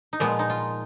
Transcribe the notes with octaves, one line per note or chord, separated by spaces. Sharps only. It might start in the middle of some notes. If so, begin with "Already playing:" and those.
D#4
A#2 F3 G#3 B3 F4
D#4
F4